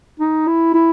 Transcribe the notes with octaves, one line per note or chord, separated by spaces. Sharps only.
D#4
E4
E4